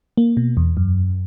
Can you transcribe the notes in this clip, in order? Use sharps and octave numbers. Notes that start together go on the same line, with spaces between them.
A#3
B2
E2
F#2